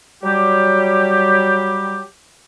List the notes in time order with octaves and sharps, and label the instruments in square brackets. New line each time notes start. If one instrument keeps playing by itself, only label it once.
[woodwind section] F#3 G3 G4